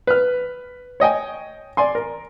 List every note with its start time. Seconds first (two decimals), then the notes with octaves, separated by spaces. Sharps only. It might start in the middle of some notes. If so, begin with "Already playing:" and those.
0.07 B4 F6
1.00 C#5 D#5 G5 G#5
1.77 D5 G#5 C6
1.95 A#4